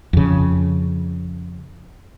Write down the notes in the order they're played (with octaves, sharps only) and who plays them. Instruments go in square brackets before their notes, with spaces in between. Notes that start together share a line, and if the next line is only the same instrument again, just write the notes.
[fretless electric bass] F2 C#3